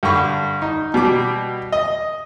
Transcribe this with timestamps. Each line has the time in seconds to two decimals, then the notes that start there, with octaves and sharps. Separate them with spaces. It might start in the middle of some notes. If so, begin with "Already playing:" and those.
0.03 G2 D3 B5 C#6
0.62 D#4
0.94 B2 G3 D6
1.72 D#5